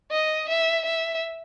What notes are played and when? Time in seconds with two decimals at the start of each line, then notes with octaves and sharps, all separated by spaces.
0.11 D#5
0.49 E5
0.86 E5